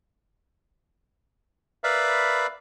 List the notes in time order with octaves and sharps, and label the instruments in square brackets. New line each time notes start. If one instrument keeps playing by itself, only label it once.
[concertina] A#4 B4 D5 E5 F5 B5